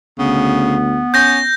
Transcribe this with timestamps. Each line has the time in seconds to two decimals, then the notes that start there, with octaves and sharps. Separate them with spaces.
0.19 D2 C#3 B3
1.14 C#4 G6 A#6